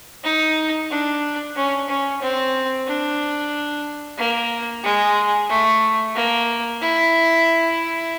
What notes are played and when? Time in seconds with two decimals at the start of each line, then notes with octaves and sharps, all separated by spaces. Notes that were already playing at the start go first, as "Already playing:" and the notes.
0.24 D#4
0.90 D4
1.56 C#4
1.89 C#4
2.21 C4
2.87 D4
4.18 A#3
4.84 G#3
5.49 A3
6.15 A#3
6.81 E4